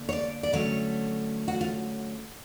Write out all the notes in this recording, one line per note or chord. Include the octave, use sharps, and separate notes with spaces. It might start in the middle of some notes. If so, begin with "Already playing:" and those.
Already playing: D3 A#3
C#5
D5
D5
D3 F#3 A3 C#4 C#5
F#4
F4